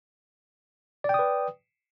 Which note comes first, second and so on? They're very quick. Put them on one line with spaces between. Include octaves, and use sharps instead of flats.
D5 G5 D#6 B4